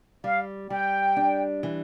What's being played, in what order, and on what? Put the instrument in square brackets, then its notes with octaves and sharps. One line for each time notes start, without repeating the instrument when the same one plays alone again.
[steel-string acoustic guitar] G3 [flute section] F5
[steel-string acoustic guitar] G3 [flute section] G5
[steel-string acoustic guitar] D4
E3